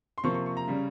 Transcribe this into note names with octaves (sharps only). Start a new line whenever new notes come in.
C6
C3 F3 A#3 C#6
C#6
C#6
A#5
C#3 G3 C#4